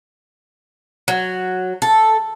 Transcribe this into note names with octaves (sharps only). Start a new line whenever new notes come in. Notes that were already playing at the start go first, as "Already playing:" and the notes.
F#3
A4